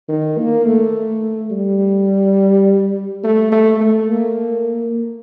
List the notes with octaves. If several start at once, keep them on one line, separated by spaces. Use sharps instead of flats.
D#3
A#3
A3
G3
A3
A3
A3
A#3